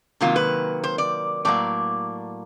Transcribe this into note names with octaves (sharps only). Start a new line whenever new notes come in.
C3 D#3 F#3 A#3 F4
B4
C5
D5
A2 F#3 A#3 D5